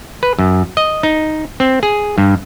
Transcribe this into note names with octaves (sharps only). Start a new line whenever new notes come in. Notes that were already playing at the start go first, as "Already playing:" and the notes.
B4
F#2
D#5
D#4
C4
G#4
G2